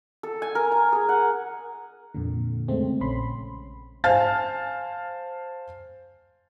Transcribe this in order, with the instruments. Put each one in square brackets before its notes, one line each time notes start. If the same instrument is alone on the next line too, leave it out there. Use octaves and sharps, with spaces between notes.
[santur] A4
G#5
A#4
A#5
G#4
F#5
[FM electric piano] F2 A#2 D3
C#3 G#3 A3 C4
A#1 C#4 B5 C6
[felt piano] C5 F5 G#5 A5 F6 A6